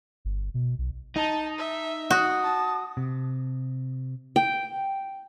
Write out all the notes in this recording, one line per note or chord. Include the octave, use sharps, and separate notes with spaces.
G1
B2
B1
D#4 A5
E5
F#4 D#6
A5
C3
G5